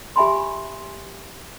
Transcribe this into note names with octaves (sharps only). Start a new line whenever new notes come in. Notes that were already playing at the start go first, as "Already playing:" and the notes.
G4 E5 G#5 B5 C6